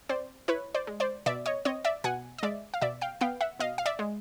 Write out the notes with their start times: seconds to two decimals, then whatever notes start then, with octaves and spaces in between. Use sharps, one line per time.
0.09 C4 C5 D5
0.48 E4 B4 C#5
0.75 C5 D5
0.87 G#3
1.00 C5 D5
1.26 B2 D5 E5
1.46 C#5 D#5
1.65 C4 C#5 D#5
1.85 D5 E5
2.04 B2 F#5 G#5
2.38 D#5
2.43 G#3 D5 E5
2.74 F5
2.82 B2 D5 E5
3.01 F5 G5
3.21 B3 F5 G5
3.41 E5 F#5
3.60 B2 D#5 F5
3.78 F5
3.86 D5 E5
3.99 G#3